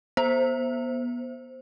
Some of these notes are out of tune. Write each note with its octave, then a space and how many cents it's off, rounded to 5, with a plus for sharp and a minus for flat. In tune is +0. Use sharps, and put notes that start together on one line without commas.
B3 -30 C5 +0